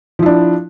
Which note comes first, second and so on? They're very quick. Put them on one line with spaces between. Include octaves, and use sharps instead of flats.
F3 E4 D4